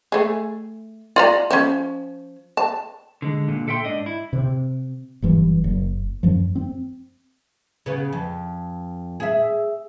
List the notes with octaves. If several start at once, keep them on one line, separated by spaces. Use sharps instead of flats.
A3 G#4
F4 D5 A#5
F3 C#4
A5
D3 G#3
A#2 D3
A4 E5 G5 C6
G#2 D4 D#5
E4
C3
F#1 G2 E3
F#1
F#2 F3
C4
C#3 B3
F2
G#4 E5